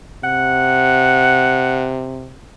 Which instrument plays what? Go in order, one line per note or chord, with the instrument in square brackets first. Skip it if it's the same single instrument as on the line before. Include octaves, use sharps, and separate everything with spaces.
[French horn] C3 [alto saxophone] F#5